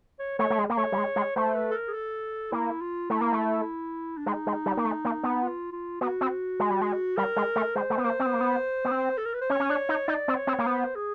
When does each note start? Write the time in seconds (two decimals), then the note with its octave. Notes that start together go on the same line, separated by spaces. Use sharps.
0.19 C#5
0.39 A3 C#5
0.50 A3
0.58 G#3
0.70 A#3
0.77 A3 C#5
0.92 G3
0.98 G#3
1.16 G#3
1.36 A3 C5
1.55 B4
1.71 A4
1.74 A#4
1.88 G#4
1.94 A4
2.52 A#3 E4
2.82 F4
3.10 A3 E4
3.21 A#3
3.33 A3
4.17 D4
4.26 G#3 D#4
4.47 G#3
4.66 G3
4.77 A#3
4.85 A3
5.05 A#3
5.23 B3
5.43 F4
5.72 F4
6.01 B3 F#4
6.21 C4
6.60 G#3
6.70 G3
6.81 G#3
7.17 G3 A#4
7.36 G#3
7.56 A3
7.76 G#3 C5
7.90 A3
7.98 B3
8.04 A#3 C5
8.20 C4
8.26 B3
8.34 A#3
8.41 B3
8.85 B3
8.91 C4
9.17 A4
9.25 A#4
9.34 B4
9.41 C5
9.50 C#4 C#5
9.60 C#4
9.70 D4
9.89 D#4
10.08 D#4 D5
10.28 C4
10.37 C#5
10.47 C4
10.59 A#3
10.66 B3 C5
10.95 G#4